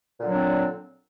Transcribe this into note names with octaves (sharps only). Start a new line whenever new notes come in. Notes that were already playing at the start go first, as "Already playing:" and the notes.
A#2 D3 F#3 C4 D4